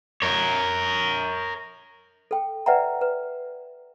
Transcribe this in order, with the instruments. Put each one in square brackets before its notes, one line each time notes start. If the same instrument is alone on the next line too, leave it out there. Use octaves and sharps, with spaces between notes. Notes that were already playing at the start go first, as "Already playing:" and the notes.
[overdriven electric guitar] A#4 C#5
[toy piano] A4 G5
B4 D5 E5 F#5 G5 A#5
B4